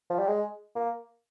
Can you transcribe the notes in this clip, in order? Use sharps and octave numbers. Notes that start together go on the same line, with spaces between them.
F3
G3
G#3
A#3